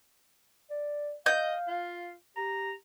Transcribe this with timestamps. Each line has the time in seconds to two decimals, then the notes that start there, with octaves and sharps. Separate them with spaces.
0.70 D5
1.26 D#5 F5 G6
1.68 F4
2.37 G4 A#5